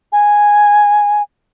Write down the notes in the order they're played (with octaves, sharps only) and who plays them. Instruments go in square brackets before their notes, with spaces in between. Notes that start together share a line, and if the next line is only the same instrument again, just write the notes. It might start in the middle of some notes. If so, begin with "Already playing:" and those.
[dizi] G#5